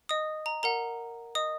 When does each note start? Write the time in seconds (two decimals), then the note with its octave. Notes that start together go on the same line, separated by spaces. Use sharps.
0.09 D#5 D#6
0.46 A#5
0.63 A#4 F#5 A#5
1.35 D#5 D#6